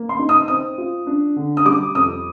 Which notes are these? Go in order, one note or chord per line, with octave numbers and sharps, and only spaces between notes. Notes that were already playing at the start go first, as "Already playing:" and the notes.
Already playing: A#3
C6
D#4
D#6
C4 D#6
F4
D4
D3
D#6
G3 D6
F2 D#6